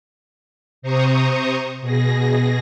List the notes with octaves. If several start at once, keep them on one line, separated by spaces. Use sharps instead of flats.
C3 C5 A#5 C#6 D#6
B2 G#4 A#6